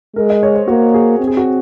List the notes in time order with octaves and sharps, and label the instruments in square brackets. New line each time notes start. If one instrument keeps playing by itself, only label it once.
[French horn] G#3 [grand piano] A#4
[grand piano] D#5
C#5
C5
[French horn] A#3 [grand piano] F#4
[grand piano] G#4
[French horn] C4
[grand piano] G#4
F#4